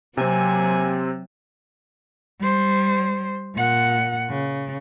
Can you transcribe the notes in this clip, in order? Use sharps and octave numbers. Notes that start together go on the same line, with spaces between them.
C3 F#3 A#3 C4 G4 G#5
G3 C5
A#2 F#5
C#3